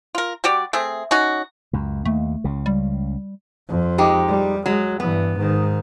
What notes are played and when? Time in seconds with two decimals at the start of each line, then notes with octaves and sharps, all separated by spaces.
0.15 F4 A#4
0.44 G3 F#4 G4 D5
0.73 A3 C4 G#4
1.11 C#4 D#4 F#4
1.73 C#2 F#2
2.05 D#2 A3
2.44 C#2 C#3
2.66 G3
3.68 F2
3.98 G#3 D#4 G4
4.28 G3
4.66 F#3 G#3
5.00 G2 E3 B3
5.37 G#2 D#3